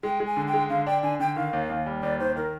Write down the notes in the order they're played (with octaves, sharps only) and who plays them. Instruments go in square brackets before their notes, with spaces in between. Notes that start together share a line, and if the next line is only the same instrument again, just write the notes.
[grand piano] G#3 [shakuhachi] G5
[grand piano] G#3
[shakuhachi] G#5
[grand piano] D3
[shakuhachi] G5
[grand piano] G#3
[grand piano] D3 [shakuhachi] F5
[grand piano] D4 [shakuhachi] G5
[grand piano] D3 [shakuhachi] G#5
[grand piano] D3 [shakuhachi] G5
[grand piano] D#3 [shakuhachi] F5
[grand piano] D#2
D#2
G3
[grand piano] D#2 [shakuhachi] D5
[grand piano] D#3 [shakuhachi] C5
[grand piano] D#3 [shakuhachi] A#4